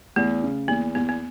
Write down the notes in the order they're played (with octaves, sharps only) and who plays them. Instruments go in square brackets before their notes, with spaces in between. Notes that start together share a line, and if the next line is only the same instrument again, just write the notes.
[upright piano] E2 [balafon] A3
[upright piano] C#3
[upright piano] E2 [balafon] A#3
[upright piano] E2 [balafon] B3
[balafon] B3